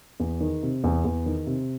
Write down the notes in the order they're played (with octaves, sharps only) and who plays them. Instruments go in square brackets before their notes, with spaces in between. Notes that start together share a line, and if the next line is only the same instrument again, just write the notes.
[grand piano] E2
D#3
C3
E2
E2
D#3
C3